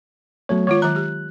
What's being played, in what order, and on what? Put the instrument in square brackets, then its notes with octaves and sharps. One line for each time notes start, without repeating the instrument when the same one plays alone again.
[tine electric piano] F#3 A3 C#5 [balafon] B3
[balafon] D#3 G#3 F4 [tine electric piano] C#5
[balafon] D#3 F#3 A#5 [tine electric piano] F#6
[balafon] G4